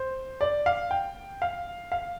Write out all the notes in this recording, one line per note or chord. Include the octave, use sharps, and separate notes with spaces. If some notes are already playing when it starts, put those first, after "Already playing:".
Already playing: C5
D5
F5
G5
F5
F5